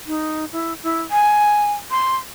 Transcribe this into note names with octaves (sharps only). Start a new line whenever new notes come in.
D#4
E4
E4
G#5
C6